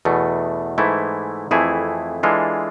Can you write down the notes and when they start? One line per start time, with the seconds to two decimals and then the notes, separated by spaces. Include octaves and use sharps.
0.05 E2 B2 A3
0.78 G#2 E3 A3 E4
1.51 F2 E3 A3 E4 G#4
2.23 E3 G#3 D4 F4 A4